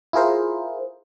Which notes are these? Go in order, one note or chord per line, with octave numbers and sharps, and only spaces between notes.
E4 F4 G#4 A#4 C5